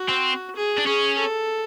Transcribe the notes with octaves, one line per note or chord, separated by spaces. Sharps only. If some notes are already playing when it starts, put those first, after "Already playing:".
Already playing: F#4
C4
G#4
D4
C#4 G#4
A4